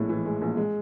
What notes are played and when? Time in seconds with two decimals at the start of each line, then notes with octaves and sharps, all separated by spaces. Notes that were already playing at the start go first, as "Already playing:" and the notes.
Already playing: A#1 A2 G#3
0.09 E3
0.26 G#3
0.42 A#1
0.57 G#3